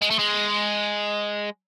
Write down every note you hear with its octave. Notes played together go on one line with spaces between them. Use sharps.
G#3
A3
G#3